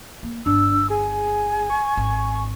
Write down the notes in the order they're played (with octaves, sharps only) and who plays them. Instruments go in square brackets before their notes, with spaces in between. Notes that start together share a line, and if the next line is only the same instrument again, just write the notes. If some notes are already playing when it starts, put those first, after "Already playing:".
[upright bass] A#3
[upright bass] G1 [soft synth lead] D4 [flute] E6
[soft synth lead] G#4 [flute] G#5
[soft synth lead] C#6
[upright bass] G#1